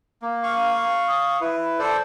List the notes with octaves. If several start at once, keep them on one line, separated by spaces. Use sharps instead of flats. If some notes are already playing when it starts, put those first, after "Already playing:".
A#3
F5 C#6
D#6
E4 B4
A4 C5 D5